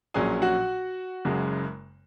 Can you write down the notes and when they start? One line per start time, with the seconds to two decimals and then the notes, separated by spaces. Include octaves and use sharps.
0.14 A#1 A#2 F#3 C#4 G#4 G#5
0.42 F#4 F#5
1.25 F#1 F#2 C#3 G#3